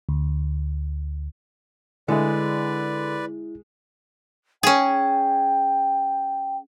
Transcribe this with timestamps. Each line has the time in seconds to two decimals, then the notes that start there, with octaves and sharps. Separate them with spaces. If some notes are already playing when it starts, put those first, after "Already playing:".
0.09 D2
2.08 D3 G#3 E4 G#4 B4 D5
4.63 C#4 G#4 G5